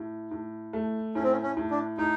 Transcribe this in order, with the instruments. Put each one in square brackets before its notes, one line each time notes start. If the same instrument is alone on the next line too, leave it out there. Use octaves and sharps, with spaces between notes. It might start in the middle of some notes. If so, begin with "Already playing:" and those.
Already playing: [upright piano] A2
A2
A3
[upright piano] A2 [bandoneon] C#4
[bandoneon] C4
C#4
C#4
[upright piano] A2
[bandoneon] D4
[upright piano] A2 [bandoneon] D#4